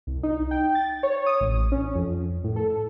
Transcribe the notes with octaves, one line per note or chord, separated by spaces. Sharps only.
C2
D#4
G5
A6
C#5
D#6
A1
C#4
F2
A2
A4